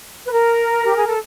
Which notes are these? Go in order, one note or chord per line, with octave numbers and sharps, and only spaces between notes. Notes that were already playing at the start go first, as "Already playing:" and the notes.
B4
A#4
G4
G#4
A4